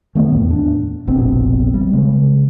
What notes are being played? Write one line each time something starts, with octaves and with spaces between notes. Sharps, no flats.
D#3 A3 B3
E2 A2
D4
F1 A#1 B2 C4
G3
C#3 G#3